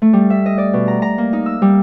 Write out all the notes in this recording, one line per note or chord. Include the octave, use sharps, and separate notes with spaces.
A3
G3
E5
D#5
D5
B2
A#5
A#5
A#3
D#4
E6
G3